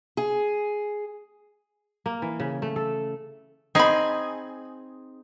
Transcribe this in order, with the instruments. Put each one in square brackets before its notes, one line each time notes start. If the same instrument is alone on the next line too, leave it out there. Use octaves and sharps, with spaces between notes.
[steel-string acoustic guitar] G#4
[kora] A#3
E3
C#3
A3
A4
[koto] C4 D#4 G#4 [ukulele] D#5 B5